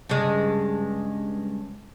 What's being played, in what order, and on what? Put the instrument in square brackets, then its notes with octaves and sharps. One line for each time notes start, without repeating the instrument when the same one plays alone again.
[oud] G2 C#3 G#3